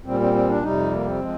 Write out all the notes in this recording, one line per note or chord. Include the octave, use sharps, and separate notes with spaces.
A#2 G3 C4
C4
C4
D4
F2 C3 G3 D#4
A#3
C4
F3 G#3